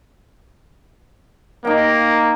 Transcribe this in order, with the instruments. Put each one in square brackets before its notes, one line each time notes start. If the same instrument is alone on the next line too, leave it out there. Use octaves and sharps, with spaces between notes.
[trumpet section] A#3 [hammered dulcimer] D#4 G5